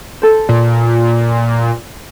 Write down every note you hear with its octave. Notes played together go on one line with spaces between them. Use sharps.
A4 C5
A#2